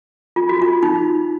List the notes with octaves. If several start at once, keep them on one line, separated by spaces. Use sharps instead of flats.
F4
F#4
F4
D#4